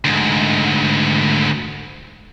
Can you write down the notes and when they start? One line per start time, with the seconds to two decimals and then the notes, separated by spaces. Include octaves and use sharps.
0.05 D2 G#2